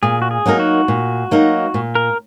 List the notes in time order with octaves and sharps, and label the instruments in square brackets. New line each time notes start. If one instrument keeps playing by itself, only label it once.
[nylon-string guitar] A#2 [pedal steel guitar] G#4
[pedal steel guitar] F#4
G#4
[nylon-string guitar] F#3 A#3 D#4 A#4
[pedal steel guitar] F#4
[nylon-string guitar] A#2
F#3 A#3 D#4 A#4
A#2
[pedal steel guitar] A#4